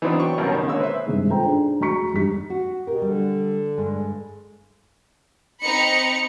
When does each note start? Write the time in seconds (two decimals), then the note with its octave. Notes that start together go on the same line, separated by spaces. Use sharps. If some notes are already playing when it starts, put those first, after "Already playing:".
0.02 E3 F#3 B3 C4 D4 D#4
0.19 F#3 G5 C#6
0.38 C2 G2 B2 F#3 C#4 A#4
0.52 D#3 C#4
0.67 D3 G#3 A#3 C#5 E6
0.80 B4 C5 E5
1.06 G2 C3 D#3 G#3
1.29 F4 A4 C5 G5 A#5
1.46 D4 D#4 G#4
1.81 F1 F#4 A#5 C#6 B6 C#7
2.13 G#1 G2 D#3 D4 G4 B6
2.50 F#4
2.87 B2 G4 A#4
3.02 D3 G3
3.77 G2 G#3
5.61 C4 D#4 C5 A#5 B5 C#7